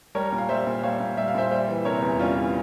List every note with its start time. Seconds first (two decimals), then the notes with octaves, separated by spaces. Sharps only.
0.15 G3 A#4 C#5
0.32 A#2
0.38 F5
0.49 G3 C5 E5
0.67 A#2
0.83 G3 C#5 F5
1.00 A#2
1.17 G3 E5
1.28 F5
1.35 A#2 C5 E5
1.51 G3 C5 E5
1.68 E3
1.85 C3 A#4 C#5
2.02 E2
2.19 G3 C#4 F4
2.37 E3